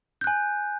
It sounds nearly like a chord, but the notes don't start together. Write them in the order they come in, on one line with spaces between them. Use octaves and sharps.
G6 F#6 G#5